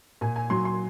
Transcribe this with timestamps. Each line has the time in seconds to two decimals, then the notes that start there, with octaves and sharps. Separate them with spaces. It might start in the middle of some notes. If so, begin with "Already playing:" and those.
0.21 A#2 G#5
0.36 G#5
0.50 F#3 C6
0.65 C6